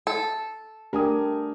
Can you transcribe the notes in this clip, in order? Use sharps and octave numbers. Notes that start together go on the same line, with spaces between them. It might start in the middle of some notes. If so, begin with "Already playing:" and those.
A4
A3 D4 G4 A#4 G#5 D#6